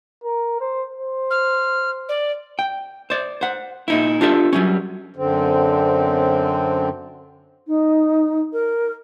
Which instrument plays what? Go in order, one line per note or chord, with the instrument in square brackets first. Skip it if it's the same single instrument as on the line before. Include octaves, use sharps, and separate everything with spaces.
[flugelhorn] A#4
C5
C5
[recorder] F6
D5
[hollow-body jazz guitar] G5
C5 D5
C5 F#5
A#2 D#4 E4
D4 F4 G4 A4 D5 E5
F#3 G3 C#4
[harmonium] F#2 D3 C4
[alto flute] D#4
A#4